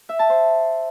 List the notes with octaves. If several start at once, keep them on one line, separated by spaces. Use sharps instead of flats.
E5
A5
C5